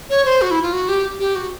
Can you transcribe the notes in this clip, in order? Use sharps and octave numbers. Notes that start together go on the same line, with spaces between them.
C#5
C5
F#4
E4
F4
F#4
G4
G4
F#4